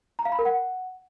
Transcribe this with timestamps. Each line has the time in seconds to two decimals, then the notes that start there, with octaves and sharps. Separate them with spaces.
0.19 A#5
0.25 F5
0.32 B5
0.39 A#4
0.45 F#5